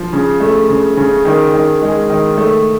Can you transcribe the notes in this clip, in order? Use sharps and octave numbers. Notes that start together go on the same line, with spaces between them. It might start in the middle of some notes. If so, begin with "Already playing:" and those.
Already playing: F3
C#3
A3
C#3
C#3
D#3
D#3
G#3
D#3
A3